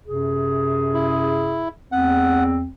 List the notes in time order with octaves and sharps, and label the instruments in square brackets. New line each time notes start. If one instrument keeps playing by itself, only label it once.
[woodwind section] F#2 C3 G#4
[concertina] E4
[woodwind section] E2 C4 [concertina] F#5